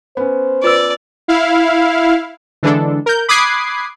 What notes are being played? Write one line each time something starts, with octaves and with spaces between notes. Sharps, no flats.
B3 C#4 C5
F4 B4 D5 E6
E4 F5
D3 E3 G#3 D4 A4
A#4 G6
B5 D6 D#6 F#6 G#6 C7